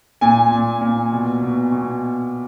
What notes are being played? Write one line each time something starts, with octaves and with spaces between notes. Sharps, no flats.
A#2 G#5
A#2
A#2
B2
B2
B2